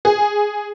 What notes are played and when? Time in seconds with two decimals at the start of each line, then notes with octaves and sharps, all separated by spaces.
0.05 G#4